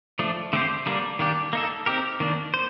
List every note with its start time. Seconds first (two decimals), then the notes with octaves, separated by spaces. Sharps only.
0.19 F3 A3 D4
0.53 D3 A3 C4 G4 C5
0.86 D3 G3 A#3 D4
1.19 D#3 A#3 D4 G4
1.53 A#3 D#4 A4
1.86 C4 D#4 G4 A#4
2.20 D#3 A#3 D4
2.54 C5